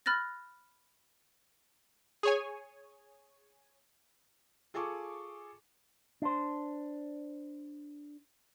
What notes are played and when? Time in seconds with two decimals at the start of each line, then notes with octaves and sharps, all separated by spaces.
0.06 B5 F6 F#6 A6 A#6
2.23 G#4 C#5 G#5
4.74 F4 G#4 A4 G#5 C#6 D6
6.22 D4 C5